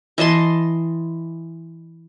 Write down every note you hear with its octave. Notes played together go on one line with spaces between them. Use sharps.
E3 D#5 A5 C6